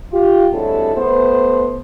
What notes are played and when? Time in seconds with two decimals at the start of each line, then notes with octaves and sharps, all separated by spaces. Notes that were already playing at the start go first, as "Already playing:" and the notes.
0.12 F4 G4
0.52 C3 F#3 G#3 D4 E4 A4
0.96 A3 B3 C5